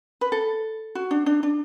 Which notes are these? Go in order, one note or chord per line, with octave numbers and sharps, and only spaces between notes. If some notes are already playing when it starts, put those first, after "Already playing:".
B4
A4
F#4
D4
D4
D4